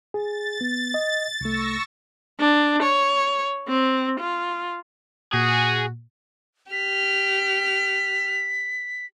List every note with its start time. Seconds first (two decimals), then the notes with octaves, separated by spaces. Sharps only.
0.14 G#4 A6
0.61 B3
0.94 D#5
1.41 C2 A3 C#6 E6 A#6
2.39 D4
2.83 C#5
3.68 C4
4.20 F4
5.34 A#2 F#4 G#4
6.72 G4 F6 B6